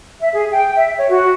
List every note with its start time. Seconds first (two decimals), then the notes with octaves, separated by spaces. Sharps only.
0.21 E5
0.34 G#4
0.51 G5
0.76 E5
0.97 C#5
1.10 F#4